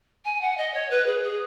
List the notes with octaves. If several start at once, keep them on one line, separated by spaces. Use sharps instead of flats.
G#5
F#5
D#5
C#5
B4
G#4
G#4